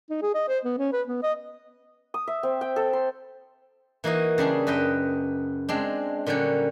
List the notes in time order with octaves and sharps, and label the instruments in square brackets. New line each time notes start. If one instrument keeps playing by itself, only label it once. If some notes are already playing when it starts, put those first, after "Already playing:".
[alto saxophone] D#4
G#4
D#5
C5
B3
C#4
B4
B3
D#5
[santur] D#6
E5
C4
G5
A4
C6
[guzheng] E3 A#3 D#4 F#4 D#5
C#3 G3 D4 G#4
F#2 B4 D#5 G5
G#3 C4 D4
A#2 D3 F#3 G3 C#4